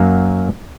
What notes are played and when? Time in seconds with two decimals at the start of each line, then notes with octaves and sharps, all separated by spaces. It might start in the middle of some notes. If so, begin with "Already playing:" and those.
Already playing: F#2 F#3 A#3